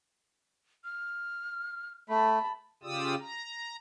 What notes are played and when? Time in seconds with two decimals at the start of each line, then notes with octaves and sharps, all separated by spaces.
0.84 F6
2.09 A3 A5 B5
2.83 C#3 F4 G4 D5 D#6 E6
3.20 A#5